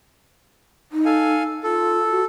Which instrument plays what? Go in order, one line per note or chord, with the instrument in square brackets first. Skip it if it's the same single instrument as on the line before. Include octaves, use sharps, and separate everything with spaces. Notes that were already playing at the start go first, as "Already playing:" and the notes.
[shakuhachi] D#4
[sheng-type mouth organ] A4 F5 G#5
[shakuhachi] F4 [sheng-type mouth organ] A4
[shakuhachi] F#4